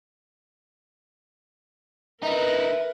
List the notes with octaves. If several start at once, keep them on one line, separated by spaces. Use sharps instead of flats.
D#4 E4 A#4 B4 E5